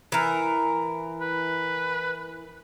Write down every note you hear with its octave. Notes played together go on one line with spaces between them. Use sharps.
E3 A#4
B4